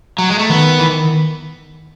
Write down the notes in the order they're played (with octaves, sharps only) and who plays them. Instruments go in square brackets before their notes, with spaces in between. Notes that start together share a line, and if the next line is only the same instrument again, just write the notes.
[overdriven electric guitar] F#3
G#3
A3
[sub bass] D#3 [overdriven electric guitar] B3
[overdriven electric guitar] E3